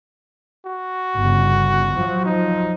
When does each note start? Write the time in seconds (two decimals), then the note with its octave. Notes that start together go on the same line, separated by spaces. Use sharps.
0.66 F#4
1.17 G1 C#3
1.93 F3 F#3
2.25 D#4